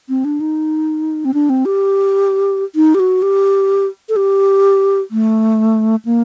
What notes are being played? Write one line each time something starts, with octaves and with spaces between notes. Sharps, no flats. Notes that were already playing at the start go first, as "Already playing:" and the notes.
C4
D4
D#4
C4
D4
C4
G4
D#4
G4
F#4
G4
A4
G4
A3
A#3